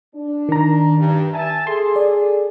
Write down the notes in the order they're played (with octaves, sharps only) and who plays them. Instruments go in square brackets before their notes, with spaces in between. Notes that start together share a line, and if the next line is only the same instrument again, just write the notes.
[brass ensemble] D4
[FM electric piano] D#3 A#5
[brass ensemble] G2
E5 G#5 A5
[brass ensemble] G#4 A4 [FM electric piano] C6
[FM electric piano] D5